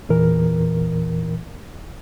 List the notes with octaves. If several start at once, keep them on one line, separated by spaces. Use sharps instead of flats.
E2 A#2 E3 A#4